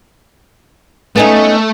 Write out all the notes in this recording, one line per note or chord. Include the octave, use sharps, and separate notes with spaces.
A3 B3 C#4 D#4